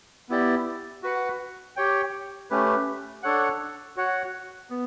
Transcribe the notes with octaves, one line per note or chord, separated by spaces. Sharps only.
B3 E4 G4 D5
F#4 B4 F#5
G4 C#5 G5
A3 C#4 G4 B4
D4 A4 C#5 F#5
F#4 C#5 F#5
B3